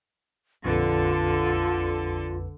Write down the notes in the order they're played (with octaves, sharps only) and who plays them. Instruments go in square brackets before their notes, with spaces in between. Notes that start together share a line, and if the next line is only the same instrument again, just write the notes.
[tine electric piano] A#1 F2 B4 [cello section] D3 A4 [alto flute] F4